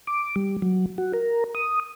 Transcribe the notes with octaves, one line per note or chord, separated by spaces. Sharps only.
D6
G3
F#3
F#4
A#4
D#6